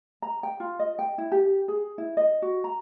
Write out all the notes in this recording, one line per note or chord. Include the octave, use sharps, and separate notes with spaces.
A#5
G5
F4
D#5
G5
E4
G4
G#4
E4
D#5
F#4
A#5